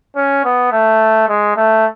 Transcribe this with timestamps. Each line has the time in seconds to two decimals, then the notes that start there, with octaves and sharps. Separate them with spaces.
0.16 C#4
0.44 B3
0.72 A3
1.29 G#3
1.56 A3